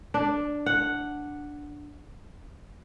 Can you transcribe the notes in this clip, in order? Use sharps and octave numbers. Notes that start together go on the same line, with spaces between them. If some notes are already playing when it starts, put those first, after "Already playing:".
D4
F#5